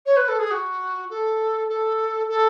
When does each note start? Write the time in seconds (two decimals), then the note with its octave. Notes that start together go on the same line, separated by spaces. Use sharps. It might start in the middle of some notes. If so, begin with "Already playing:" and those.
0.05 C#5
0.16 B4
0.28 A4
0.39 G#4
0.51 F#4
1.10 A4
1.69 A4
2.29 A4